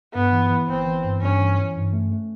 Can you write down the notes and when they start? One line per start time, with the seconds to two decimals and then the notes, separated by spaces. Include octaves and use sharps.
0.14 G2 B3
0.33 E3
0.50 E3
0.68 G1 C4
0.87 E3
1.04 G2
1.22 G2 C#4
1.40 E3
1.58 E3
1.76 G2
1.93 A3
2.12 A3